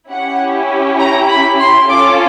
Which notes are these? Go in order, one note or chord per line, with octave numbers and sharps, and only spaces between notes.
C#4 E4 G4 F#5
A#5
B5
C6
C#4 F4 A4 D6